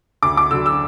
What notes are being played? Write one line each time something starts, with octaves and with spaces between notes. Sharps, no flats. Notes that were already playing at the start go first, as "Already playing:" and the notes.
D2 D6
D6
D3 F#3 E6
E6